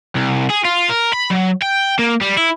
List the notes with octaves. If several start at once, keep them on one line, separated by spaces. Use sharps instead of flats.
C2
G#4
F4
A#4
B5
F#3
G5
A#3
G3
E4